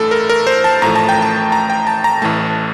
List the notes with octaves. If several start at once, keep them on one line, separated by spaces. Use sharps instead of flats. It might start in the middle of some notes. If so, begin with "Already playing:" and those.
Already playing: A1 G2 E3 A3 A4
A#4
A#4
C5
A5
A1 A2 F3 A3 A#5
A5
G5
A5
A#5
G5
A5
A#5
A1 A2 E3 A3 A5